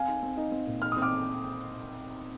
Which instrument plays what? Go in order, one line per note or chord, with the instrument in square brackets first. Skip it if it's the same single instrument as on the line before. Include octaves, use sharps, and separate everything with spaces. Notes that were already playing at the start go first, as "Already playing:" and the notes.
Already playing: [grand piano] C4 [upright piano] F5 G#5
[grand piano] D#4
C4
D#4
C4
A#2
[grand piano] D#4 [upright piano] F6
[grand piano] C4 [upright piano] D#6
[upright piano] D6 F6